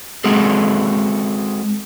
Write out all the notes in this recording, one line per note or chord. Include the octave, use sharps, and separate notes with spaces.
G#3 C4 F#4 G#4 A4